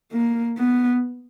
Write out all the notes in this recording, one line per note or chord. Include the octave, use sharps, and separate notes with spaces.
A#3
B3